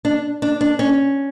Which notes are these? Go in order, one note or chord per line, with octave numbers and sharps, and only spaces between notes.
D4
D4
D4
C#4